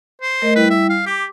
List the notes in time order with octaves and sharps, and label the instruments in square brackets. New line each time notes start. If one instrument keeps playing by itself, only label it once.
[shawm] C5
[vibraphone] A3 A#4 D#5
[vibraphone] G3 E4 G5 [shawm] B4
[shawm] E5
F5
[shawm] G4 [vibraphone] D6